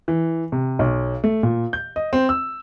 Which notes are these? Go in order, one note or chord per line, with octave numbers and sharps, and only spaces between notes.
E3
C3
B1
A3
A#2
G6
D#5
C4
E6